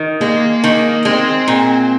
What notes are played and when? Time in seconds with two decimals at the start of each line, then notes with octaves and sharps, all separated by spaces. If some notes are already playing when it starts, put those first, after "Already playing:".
Already playing: D#3
0.21 G#3 A#3
0.64 D#3
1.05 G#3 C4
1.48 A#2